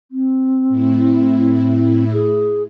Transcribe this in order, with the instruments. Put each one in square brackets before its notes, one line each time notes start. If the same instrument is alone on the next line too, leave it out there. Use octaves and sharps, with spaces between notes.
[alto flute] C4
[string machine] A2 E4
[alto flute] G#4